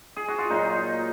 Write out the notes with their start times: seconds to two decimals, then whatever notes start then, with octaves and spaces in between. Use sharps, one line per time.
0.16 G#4
0.28 F#4
0.38 F4
0.50 A#2 F#3 D#4